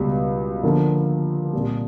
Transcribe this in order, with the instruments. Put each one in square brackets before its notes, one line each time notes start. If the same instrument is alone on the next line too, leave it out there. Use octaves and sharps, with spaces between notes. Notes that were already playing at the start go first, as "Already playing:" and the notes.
Already playing: [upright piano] C#2 B2 G3
D3 F3 A#3
C2 A#2 G3